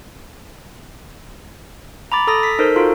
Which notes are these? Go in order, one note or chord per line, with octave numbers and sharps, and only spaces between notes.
A#5 B5 D6 A6
A4 A#5 D#6 A6 A#6
B6
D#4 A4 A#4 C5
D#4 F4 F#4 A4